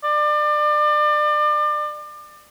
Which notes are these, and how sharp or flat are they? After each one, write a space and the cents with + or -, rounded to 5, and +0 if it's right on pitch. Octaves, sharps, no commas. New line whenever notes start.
D5 +30